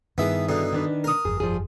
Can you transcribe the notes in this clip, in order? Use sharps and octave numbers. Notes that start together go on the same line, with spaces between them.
G2 D#3 B3 E4 G#4 E5
B2 D3 D#4
D#3 D4 B4
A#4 D#6
G1 F2 G#4
F3 G3 G#4